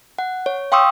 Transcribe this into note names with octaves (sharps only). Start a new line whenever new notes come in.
F#5
C#5
F5 G5 C6 C#6 D#6 E6